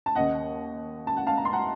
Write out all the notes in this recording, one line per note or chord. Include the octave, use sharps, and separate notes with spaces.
A5
D#2 C#3 D#5 F#5
A5
F#5
F5 A5
A#5
C6
F#5 A#5